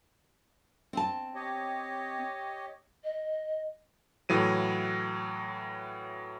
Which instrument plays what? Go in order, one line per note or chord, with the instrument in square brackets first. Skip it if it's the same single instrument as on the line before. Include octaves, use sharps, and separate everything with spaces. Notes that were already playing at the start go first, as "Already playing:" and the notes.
[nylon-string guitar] C4 A5
[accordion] G4 C#5 D#5
[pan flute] D#5
[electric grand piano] A2 E3 F#3 D#7